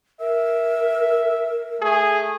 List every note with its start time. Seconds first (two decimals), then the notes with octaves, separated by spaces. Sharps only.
0.21 A#4 E5
1.82 A3 G#4